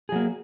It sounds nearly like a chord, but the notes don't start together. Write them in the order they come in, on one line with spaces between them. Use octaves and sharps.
G#4 F#3 A#3